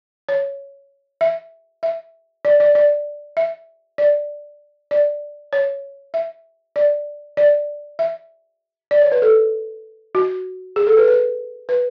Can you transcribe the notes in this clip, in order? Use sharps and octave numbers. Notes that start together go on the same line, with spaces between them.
C#5
E5
E5
D5
D5
D5
E5
D5
D5
C#5
E5
D5
D5
E5
D5
C#5
B4
A4
F#4
G#4
A4
B4
B4
B4